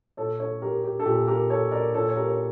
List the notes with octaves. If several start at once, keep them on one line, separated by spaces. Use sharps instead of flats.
A#2 A4 C#5
A4 C#5
G4 A#4
G4
A4
A#2 G4
G4 A#4
A4 C#5
A#4 D5
A#2 A4 C#5
C#5
G4 A#4
C#5